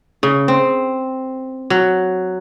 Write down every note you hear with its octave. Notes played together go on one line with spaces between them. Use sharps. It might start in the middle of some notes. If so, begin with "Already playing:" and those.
C#3
C4
F#3